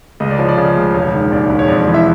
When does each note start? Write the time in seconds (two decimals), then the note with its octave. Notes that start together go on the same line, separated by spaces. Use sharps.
0.20 C#2 D#5
0.30 D5
0.39 F3 C#5
0.49 D5
0.57 C#3
0.76 C#2
0.94 E1 C#5
1.13 D#3
1.32 D#2 D5
1.50 E1
1.59 C#5
1.68 F2 D5
1.87 E3
1.94 E5